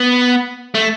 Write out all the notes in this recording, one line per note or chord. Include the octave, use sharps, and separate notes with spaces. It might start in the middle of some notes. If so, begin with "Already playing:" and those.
Already playing: B3
A3